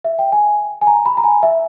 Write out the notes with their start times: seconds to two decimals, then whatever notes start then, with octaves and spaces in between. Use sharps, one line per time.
0.04 E5
0.19 G5
0.32 G#5
0.81 G#5
0.87 A#5
1.06 B5
1.17 A#5
1.24 G#5
1.43 E5